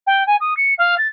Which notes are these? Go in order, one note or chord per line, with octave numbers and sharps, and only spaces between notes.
G5
G#5
D#6
C#7
F5
A6